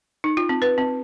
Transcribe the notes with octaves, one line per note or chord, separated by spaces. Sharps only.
D#4
F4
C4
B4
C4